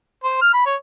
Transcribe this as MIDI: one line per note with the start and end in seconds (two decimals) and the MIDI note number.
0.24 0.42 72
0.42 0.53 89
0.54 0.62 83
0.66 0.76 73